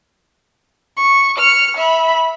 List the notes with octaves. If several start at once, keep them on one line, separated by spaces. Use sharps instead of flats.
C#6
F6 C#7
E5 B5